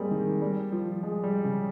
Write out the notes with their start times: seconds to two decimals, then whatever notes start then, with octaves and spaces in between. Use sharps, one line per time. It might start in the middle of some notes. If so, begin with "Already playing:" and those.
Already playing: G3 G#3 A#3 C4
0.11 D#3
0.42 G3
0.72 F3
1.03 G#3
1.23 G3
1.44 C#3